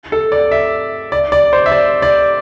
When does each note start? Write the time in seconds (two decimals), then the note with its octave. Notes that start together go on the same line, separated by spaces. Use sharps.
0.12 A4
0.32 D5
0.51 E5
1.12 D5
1.32 D5
1.53 C5
1.66 E5
1.72 D5
2.02 D5